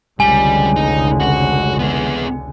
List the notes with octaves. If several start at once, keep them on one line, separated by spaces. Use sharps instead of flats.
F1 C#2 D3 G3 G#5
D#4
F#4
B3 G#4